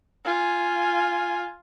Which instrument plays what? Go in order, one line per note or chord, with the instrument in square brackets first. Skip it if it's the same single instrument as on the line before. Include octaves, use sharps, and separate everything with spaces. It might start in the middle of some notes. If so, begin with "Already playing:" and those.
[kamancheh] F4 G#5